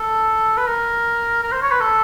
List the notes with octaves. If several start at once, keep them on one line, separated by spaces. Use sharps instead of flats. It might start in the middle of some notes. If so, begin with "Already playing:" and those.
Already playing: A4
B4
A#4
A#4
C5
C#5
B4
A4